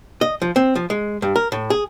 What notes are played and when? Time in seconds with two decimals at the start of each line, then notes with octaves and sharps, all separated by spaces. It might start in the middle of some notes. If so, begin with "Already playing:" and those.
0.21 D#5
0.42 F3
0.56 C4
0.75 F3
0.90 G#3
1.22 G2
1.36 A#4
1.52 A2
1.70 G#4